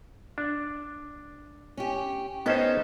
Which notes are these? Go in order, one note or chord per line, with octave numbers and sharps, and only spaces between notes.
D4
C#4 G4
B3 C#4 D#4 A4 C5